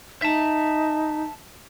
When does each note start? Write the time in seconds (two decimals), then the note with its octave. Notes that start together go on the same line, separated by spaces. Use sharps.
0.22 D#4 E5 A5